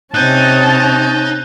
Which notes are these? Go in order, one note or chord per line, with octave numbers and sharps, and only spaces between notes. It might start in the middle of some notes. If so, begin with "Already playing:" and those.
C3 C#4 D#4 A5 F#6 G6